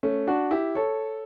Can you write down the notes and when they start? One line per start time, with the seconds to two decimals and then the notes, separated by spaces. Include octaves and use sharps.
0.03 A3 C#4
0.27 D4 F#4
0.51 E4 G4
0.75 A4 C#5